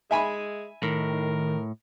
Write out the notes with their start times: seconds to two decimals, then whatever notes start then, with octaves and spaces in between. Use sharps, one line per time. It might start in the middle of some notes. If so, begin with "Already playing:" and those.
0.11 G#3 E5 G#5 B5
0.83 A2 D#3 A#4